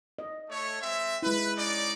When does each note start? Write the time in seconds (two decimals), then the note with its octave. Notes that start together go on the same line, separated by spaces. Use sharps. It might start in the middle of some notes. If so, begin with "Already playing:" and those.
0.19 D#5
0.49 A3 C#5
0.81 G#3 C4 E5
1.22 G#3 E4 B4
1.56 C#4 D#4 D5